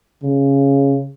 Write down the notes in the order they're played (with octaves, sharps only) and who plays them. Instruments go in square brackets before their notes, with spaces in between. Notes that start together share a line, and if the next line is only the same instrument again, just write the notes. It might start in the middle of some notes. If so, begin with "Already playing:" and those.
[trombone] C#3